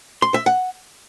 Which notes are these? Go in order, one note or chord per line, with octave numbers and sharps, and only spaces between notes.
C6
E5
F#5